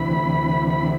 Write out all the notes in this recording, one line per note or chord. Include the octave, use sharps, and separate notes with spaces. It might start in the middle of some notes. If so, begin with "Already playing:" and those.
Already playing: D2 C3 E3 B5
B5